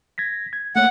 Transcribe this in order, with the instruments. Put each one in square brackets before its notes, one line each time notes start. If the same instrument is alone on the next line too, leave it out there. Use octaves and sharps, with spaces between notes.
[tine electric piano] G#6 A#6 B6
G#6
[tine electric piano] A3 A#3 C#5 [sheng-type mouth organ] F#5